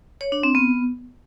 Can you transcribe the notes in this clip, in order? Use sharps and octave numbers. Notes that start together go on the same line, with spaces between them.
C#5
D4
C4
B3